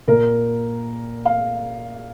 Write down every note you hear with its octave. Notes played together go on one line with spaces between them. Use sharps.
A#2 A#4
F5